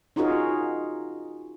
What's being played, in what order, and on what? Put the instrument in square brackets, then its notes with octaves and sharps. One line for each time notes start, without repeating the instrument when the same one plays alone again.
[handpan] C#4 D#4 F4 F#4 G#4 A#4